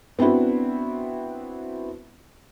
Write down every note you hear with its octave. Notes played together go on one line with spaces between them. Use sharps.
B3 C4 D4 E4 F#4